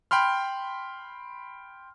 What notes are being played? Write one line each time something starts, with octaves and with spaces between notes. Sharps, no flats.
G5 B5 C6 F6